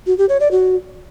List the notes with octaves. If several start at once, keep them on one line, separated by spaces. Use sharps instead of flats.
F#4
G4
C#5
D5
F#4